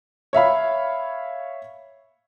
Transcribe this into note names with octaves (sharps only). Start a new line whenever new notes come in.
C#5 E5 F5 B5